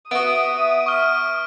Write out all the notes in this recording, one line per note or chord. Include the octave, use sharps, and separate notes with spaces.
B3 F#4 E5 D#6 D7
C#6 F6